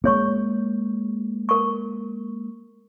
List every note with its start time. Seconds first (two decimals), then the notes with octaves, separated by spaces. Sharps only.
0.04 G#3 A#3 G#4 C#5 C#6
1.49 A#4 C#6